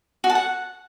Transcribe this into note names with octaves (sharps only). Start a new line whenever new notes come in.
F#4
A5
F#5